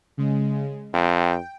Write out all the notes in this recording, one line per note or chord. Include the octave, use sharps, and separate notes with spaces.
C#3 G#3
F2 G5